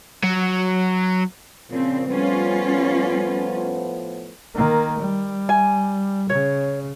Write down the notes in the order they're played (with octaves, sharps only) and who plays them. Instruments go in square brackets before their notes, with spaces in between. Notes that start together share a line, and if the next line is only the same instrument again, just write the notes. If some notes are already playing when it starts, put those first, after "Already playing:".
[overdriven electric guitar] F#3
[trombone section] A#2 F3 [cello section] C#3 C4
[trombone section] A2 F3 B3 [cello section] G3 C#4 F4
[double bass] D#3 A#3
G3
[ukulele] G#5
[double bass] C#3 [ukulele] C#5